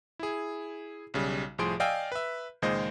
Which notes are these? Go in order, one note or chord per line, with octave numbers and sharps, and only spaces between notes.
E4 G#4
B1 C#3 G3
C2 A2 F3 G#4 C6 D7
D5 D#5 F5 G5 G#5 E6
B4 E5
C#2 A#2 D#3 G#3 C5 D#5